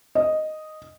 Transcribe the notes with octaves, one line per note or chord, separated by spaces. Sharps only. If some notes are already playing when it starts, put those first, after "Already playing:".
D#5